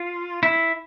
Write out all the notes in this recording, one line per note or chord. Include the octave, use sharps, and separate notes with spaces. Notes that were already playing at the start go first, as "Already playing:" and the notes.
Already playing: F4
E4